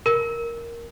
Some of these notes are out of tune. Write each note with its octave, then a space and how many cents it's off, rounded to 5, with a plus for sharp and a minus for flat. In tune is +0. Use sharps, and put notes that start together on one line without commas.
A#4 +0